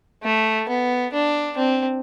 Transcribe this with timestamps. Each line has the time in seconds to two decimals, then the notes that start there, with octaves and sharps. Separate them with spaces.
0.23 A3
0.69 B3
1.13 D4
1.57 C4